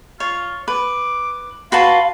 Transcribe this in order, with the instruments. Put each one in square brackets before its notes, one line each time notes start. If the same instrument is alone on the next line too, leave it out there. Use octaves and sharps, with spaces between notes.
[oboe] F4 [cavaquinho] C#5
[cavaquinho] B4 [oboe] D6
[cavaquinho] F#4 B4 A5 [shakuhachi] F5 [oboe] C6